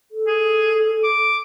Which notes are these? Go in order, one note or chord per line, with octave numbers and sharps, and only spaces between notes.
A4
G#4
D6